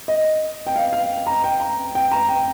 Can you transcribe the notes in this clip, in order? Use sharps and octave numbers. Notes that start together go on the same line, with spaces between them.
D#5
G5
F5
F5
A#5
G5
A#5
G5
A#5
G5